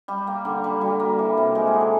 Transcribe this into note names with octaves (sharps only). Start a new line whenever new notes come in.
G3 G4
A#3
D3
G3
G3 F#4
A#3
E3
C3
G#3 G4
G#4
D3
A4